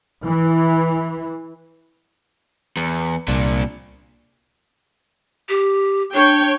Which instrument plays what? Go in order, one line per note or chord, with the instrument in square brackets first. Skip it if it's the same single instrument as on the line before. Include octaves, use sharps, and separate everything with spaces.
[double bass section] E3
[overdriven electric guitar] E2
[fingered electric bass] C2 [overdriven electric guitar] A#2 D4
[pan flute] G4
[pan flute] D4 [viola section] C#5 G5